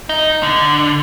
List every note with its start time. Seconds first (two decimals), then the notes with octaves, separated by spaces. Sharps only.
0.09 D#4
0.43 D3